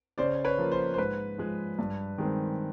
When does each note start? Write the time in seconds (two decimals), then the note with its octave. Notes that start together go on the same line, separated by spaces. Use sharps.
0.18 C#3 C5 D5
0.45 B4 C#5
0.58 F3 A#3
0.72 C5
0.94 C5
0.98 G#2 B4
1.38 F3 G#3
1.79 G2
2.18 D#3 G#3 C4